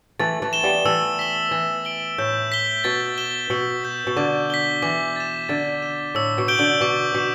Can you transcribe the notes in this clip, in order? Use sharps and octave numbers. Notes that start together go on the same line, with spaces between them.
E3 A3 A6
E3 A3
E7 G7
G3 B3
E3 A3 E6
B6 G7
E3 A6
D7 G7
A2 G6
B6 G7
B2 A6
E7 G7
B2 E6
G6 B6
B2
D3 D6
B6 G7
E3 D6
A6 E7
D3 A6
E7 G7
A2 E6
B2
G6 D7 G7
D3
B2 D6
B2 B6 E7